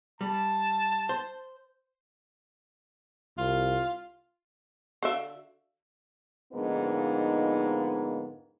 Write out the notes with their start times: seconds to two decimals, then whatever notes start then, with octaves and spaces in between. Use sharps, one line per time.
0.21 G3 A5
1.09 C5
3.38 C2 F4
5.03 D3 F#4 A4 E5 F5
6.52 F2 G#2 D3 A#3 B3 D#4